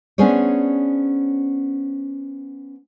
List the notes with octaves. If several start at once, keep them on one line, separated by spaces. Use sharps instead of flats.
B3 C#4 D4 G#4 C5 C#5